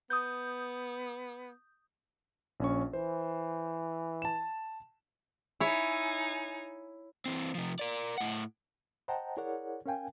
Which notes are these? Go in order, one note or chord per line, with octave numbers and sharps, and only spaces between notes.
B3 D#6 G6
A#1 C#4 C#6
E3 C5
A5 E7
D#4 E4 C#5 G#5
E3 C4
C3 F3
A#4 D5
A2 F#5
C5 D#5 F#5 G5 A5 A#5
E4 G#4 A#4 C#5 D5 F#5
C#4 A#4 F5 G5 G#5